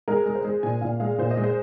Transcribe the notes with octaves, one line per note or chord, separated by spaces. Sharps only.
G#3 A#4
G#3
C5
G#3
A#2 G#5
A#2 F5
G#3 F5
A#2 C5
D#5
G#3
C5